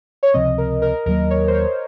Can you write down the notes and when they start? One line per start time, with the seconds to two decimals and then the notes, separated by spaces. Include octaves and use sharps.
0.23 C#5
0.34 C#2 C3 F3 C4 D#5
0.58 A#4
0.82 A#4
1.06 D#2 D#3 F#3 A#3 A#4
1.30 C#5
1.48 C5
1.54 C#5